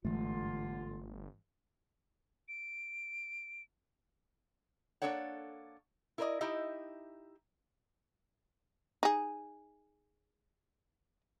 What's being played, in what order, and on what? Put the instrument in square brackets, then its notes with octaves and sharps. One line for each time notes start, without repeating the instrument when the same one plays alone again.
[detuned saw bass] G1 [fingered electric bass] G#2 E3 G#3 [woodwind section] D3 F4 [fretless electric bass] A3
[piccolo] D7
[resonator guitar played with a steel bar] A#3 B3 D4 A4 C#5 F#5
E4 A#4 B4 D5 D#5
D#4 E4 G4 D#5 E5
[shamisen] D#4 G#4